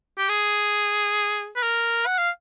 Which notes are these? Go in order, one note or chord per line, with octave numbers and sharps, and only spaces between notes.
G4
G#4
B4
A#4
F#5
F5